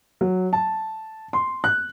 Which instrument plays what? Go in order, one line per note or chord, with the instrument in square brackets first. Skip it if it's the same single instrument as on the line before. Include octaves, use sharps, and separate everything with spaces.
[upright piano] F#3
A5
C6
F#6